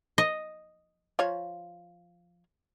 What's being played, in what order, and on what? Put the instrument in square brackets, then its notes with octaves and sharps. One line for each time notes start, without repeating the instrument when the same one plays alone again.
[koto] D#5
[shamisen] F3 F4 C#5